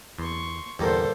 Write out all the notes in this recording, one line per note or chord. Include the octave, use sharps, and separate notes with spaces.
E2 C6 C#6
E2 G2 A#2 D3 G4 A4 C5 A#5